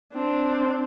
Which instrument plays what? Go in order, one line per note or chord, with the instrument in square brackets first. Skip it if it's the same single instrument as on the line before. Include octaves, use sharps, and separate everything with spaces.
[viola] C4 D4